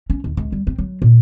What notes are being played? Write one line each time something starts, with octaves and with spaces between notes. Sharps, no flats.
C#4
D#2
C#2
G3
C4
F#3
A#2